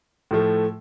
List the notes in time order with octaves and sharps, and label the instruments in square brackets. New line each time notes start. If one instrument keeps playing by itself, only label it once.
[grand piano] A2 F3 A3